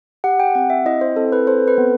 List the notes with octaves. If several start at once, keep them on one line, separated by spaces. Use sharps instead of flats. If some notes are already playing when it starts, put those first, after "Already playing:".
G4 F#5
G5
C4 F#5
E5
E4 D#5
C5
C4 A4
B4
A4 C5
B4
B3